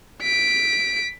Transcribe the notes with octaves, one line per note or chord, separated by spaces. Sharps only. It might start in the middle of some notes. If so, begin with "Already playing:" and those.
B6 D7